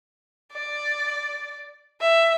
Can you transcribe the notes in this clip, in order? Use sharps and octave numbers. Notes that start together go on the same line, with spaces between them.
D5
E5